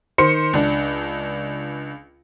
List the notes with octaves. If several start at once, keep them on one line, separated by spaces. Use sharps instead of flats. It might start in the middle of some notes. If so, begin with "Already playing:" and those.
D#3 C5 C6 C#7
C#2 D4